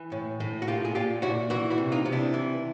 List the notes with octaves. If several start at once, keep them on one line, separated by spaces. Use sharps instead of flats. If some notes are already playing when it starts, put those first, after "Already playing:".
Already playing: E3
A2
A2
F#4
A#2 F4 G4
G#4
A#2 F4 G4
A#2 E4 F#4
E3 E4 F#4
E4 F#4
C3
D#4 F4
C3
D4 E4
E3